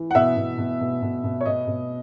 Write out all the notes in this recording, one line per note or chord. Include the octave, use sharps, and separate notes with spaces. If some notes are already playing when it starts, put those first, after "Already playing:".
Already playing: E3
F#5
B2 E5
B2
B2
B2
B2
B2
C#5
B2 D#5
B2